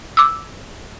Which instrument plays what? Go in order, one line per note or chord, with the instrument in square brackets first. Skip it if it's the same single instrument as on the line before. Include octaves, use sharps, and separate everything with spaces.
[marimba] D6 E6